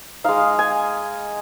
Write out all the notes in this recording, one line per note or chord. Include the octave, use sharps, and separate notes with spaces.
G#3 D#4 F5
G#5